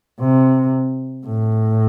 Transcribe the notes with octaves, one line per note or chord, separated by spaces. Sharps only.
C3
A2